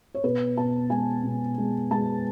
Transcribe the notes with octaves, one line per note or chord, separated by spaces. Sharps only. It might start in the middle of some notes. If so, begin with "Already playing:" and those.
C#5
B2 B4
B2 A5
G#3 G#5
B2
G#3
G#3 A5